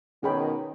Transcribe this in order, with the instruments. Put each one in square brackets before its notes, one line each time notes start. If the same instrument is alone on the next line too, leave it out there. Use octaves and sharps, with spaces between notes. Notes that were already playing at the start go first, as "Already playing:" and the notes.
[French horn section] B2 D#3 [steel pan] C#4 G#4 C#5 G5 B5